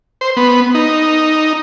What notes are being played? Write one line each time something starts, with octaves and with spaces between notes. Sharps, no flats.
C5
B3
D#4